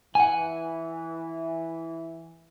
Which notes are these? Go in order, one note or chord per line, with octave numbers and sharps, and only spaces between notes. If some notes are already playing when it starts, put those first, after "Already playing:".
E3 F#5 G#5